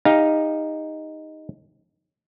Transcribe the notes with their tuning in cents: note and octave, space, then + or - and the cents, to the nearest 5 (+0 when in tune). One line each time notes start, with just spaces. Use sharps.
D#4 +0 G4 +35 F5 +0